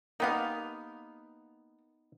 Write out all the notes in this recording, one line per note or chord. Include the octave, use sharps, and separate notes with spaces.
A#3 B3 D#4 G4 F5